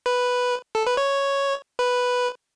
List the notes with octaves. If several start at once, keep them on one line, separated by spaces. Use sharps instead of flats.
B4
A4
B4
C#5
B4